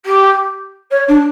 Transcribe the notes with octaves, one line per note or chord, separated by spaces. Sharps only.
G4
C#5
D4